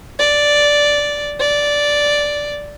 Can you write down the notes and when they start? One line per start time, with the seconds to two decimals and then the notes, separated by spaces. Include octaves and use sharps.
0.19 D5
1.40 D5